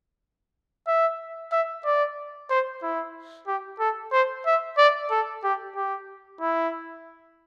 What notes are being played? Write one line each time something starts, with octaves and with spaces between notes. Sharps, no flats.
E5
E5
D5
C5
E4
G4
A4
C5
E5
D5
A4
G4
G4
E4